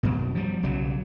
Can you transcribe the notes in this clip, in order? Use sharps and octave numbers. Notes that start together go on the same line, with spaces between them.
F#2 B2
F3 G3
B1 C#3 F#3